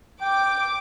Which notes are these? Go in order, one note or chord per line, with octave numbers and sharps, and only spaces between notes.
G5 D6